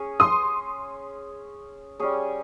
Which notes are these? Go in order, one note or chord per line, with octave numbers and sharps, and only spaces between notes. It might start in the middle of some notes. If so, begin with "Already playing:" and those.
Already playing: C#4 G#4 C#5
C6 D#6
G3 C#4 G#4 C#5